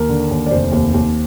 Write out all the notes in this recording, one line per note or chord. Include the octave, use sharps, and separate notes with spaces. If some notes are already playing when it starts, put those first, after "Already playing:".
Already playing: D#2 A#4
D3
D#2
D5
F1 C5
D#2
D#2